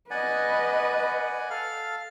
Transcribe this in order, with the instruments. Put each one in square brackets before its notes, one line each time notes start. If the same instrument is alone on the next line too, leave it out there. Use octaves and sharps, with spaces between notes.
[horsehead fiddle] B4 D#5 [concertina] D5 F#5 G#5
[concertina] A4 F5 F6